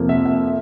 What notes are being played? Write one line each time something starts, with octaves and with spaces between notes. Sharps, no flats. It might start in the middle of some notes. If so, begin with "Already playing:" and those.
Already playing: F2 C3 F3 A#3
E5
E5